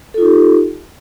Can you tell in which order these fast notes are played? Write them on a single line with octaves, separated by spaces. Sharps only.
A4 F4 D#4 G4